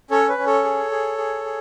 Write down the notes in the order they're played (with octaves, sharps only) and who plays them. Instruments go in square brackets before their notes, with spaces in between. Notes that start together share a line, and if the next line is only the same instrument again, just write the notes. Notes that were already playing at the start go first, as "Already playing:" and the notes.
[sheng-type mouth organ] C#4 A4 C#5
B4
C#4
A4 C#5
G#4
G#4
G#4
G#4